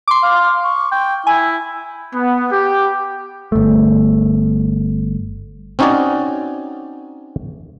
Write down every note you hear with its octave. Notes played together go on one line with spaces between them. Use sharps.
C6 D6
F5
C#6
G5
E4 G#5
B3
G4
G1 A3
C4 C#4 D#4 F#4 C#5 D5